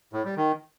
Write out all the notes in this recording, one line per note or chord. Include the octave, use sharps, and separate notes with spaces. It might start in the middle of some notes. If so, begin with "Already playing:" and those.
A2
G3
D#3